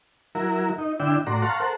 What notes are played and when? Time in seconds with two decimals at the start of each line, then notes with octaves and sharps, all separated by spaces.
0.35 F#3 E4 A#4
0.78 D#4
1.00 D3 D4 E4 G5 E6
1.27 A2 F#4 D5 A#5 C6
1.42 F5 F#5 A5 A#5 C6 C#6
1.60 A4 A#4 C5 F#5